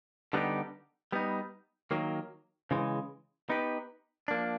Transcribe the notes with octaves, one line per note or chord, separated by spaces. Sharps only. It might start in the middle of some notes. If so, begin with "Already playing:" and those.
D3 G3 B3 D#4 G4
G3 B3 D#4
D#3 F#3 A#3
C#3 E3 G#3
B3 D#4 G4 B4
F3 A#3 D4